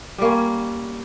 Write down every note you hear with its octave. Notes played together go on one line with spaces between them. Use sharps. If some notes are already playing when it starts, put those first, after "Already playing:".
G3 A#3 C#4